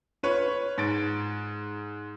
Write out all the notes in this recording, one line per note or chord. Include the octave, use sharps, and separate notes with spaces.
F4 B4 C#5
G#2 A6 D7